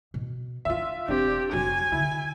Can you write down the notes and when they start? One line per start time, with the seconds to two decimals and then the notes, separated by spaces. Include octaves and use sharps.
0.14 B2
0.65 D#3 D4 F4 E5
1.08 E1 C4 D4 G4
1.53 F1 F#3 G#5
1.92 D3 D#3 E4